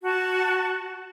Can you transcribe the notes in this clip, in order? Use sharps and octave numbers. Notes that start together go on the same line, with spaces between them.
F#4 A5